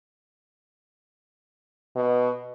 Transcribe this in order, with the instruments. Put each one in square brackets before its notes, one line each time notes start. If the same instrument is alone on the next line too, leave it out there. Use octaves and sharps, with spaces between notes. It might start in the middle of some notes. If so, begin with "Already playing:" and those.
[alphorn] B2